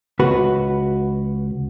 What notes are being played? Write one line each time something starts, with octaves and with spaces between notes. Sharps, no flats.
C#2 F#4 B4